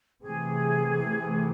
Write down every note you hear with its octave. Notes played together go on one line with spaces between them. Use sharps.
C3 E3 A3 G#4